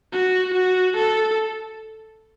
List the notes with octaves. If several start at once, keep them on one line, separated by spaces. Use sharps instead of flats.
F#4
F#4
A4